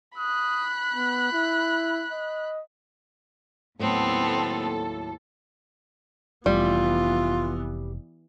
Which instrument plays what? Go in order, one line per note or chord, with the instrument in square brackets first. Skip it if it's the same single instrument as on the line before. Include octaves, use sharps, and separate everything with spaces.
[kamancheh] B5 F#6 [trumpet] D#6
[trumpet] B3
E4
D#5
[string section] D#2 A4 [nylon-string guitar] A2 F#3 [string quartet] B3 C4
[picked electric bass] F1 [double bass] E3 B3 [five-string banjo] G3 [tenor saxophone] F4